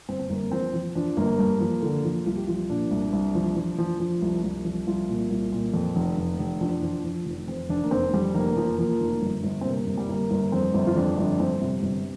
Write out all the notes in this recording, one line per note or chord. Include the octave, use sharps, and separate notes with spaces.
G1 C4
C4
G1 A#3
F3 C4
F3
F3 D4
G1 A#3
G2
F3
D3
F3
C2 F4
G4
F3 F4
A#2 D4
C2
C2
F3
F3
F3
F3
C2
C2
F3
C2 F4
A#2
C2
A#2
F2
F1
F1
F1
F3 D4
F3
F3
F1
F2 C4
F1 D4
A#3
F1 C4
F2 G3
F1 A#3
F3
F3 A#3
F1
G1
G1
C4
C3 A#3
G1
G3
G1 A#3
G1
F2 C4
G1
F4
F2 D4
G1 D4
G1 C4
C3
G1